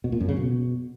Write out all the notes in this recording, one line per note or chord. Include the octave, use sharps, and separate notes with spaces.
B2
A#2
F#2
C#3
B2